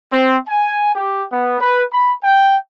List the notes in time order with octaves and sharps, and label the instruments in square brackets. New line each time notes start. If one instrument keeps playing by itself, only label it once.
[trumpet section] C4
G#5
G4
B3
B4
B5
G5